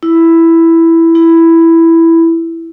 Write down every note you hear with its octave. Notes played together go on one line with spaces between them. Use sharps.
E4
E4